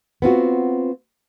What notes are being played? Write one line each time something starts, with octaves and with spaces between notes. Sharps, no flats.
B3 C4 F4 F#4